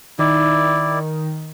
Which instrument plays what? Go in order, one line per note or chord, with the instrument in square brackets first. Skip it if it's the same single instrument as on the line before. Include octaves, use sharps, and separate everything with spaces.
[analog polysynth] D#3 [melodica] E4 D5